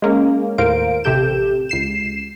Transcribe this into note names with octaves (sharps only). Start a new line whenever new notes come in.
G#3 A#3 C#4
D#2 A2 A#4 C5 F5 D7
A1 C3 G4 A4 G6 E7
C#2 C7 E7